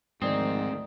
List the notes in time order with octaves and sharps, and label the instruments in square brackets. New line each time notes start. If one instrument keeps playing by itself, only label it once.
[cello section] D2 D#3 F3 [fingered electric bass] G#2 [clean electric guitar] C4 [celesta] A#4 D5 D#6